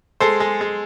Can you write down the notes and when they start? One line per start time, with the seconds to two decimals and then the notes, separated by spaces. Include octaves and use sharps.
0.20 G#3 A4 C5
0.40 G#3
0.61 G#3